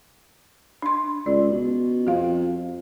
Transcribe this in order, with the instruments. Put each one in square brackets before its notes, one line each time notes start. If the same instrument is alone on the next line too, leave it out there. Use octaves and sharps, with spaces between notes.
[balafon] D4 C6
[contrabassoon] C#2 [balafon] D5
[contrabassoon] B2
[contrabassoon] F2 [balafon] G4 F5